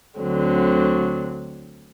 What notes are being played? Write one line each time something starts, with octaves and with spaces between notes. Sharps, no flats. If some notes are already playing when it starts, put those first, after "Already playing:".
D2 D3 F#3 C4